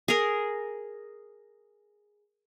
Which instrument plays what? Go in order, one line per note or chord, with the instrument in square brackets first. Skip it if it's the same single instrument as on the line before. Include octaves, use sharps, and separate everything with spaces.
[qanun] G#4 A#4